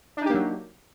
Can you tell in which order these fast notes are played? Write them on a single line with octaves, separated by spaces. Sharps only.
D4 D#4 G4 A#3 F#3